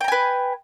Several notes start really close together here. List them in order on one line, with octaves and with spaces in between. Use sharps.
G5 A#5 G#5 B4